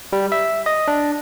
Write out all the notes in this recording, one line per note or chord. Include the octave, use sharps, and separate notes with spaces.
G3
E5
D#5
D4